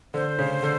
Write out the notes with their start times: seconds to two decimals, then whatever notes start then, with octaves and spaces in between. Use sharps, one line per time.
0.14 D3 C5
0.39 C#3
0.63 D3